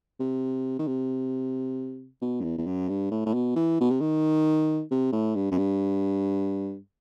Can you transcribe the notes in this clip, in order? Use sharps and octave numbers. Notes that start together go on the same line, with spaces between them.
C3
D#3
C3
B2
F#2
E2
E2
F#2
G2
A2
A2
B2
E3
B2
C3
D#3
C3
A2
G2
F#2
G2